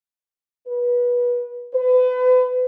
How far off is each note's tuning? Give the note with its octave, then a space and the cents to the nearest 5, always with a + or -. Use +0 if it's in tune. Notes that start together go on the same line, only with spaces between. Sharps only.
B4 -25
B4 +35